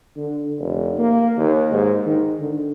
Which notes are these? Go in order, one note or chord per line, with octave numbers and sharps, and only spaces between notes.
D3
F1
A#3
D#2
G#2
D#3
D3